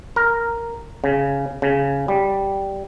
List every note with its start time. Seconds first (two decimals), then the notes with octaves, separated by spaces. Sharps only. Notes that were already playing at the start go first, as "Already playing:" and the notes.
0.16 A#4
1.04 C#3
1.62 C#3
2.08 G3